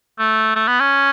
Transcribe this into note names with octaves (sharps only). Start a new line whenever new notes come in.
A3
A3
B3
C#4